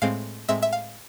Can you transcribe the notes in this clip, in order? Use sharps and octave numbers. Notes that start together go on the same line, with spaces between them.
A2 G#3 C4 F5
A2 G#3 C4 E5
E5
F5